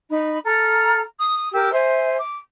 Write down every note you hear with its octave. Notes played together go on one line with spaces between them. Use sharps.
D#4 B5
A4 A#5 F6
D#6
G4 A#4 E6
C5 E5 G#5
D6